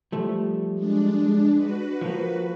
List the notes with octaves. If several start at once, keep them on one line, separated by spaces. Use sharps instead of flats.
F3 G3 A3
G#3 D4
F#4 B4
F3 A#3